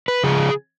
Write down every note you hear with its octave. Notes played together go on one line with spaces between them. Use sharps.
B4
C#3 F3 G#4